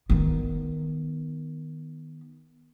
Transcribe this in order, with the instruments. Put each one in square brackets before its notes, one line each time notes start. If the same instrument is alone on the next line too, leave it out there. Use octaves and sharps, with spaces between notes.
[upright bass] D#3 B3